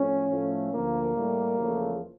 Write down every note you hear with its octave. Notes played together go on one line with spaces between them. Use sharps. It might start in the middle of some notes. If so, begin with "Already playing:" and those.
Already playing: A2 F3 A3 C#4
A2 F3 A3
D2 D3 F3 A#3
A2 G3
E2 C#3 F3 A3